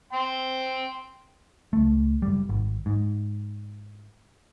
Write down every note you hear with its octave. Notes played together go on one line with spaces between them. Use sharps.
G5 C6
C#2 A3
F#1 G3
G#1
G#2